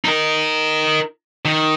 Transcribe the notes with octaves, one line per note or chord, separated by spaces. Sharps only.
D#4 A#4
D#3